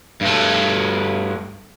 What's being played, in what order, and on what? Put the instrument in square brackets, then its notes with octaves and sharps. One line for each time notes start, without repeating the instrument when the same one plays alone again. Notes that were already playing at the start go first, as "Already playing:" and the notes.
[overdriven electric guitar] G2 A3